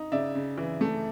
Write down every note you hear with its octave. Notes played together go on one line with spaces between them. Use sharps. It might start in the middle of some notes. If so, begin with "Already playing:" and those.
Already playing: D#4
C#3 D5 E5
C#3
E3
A3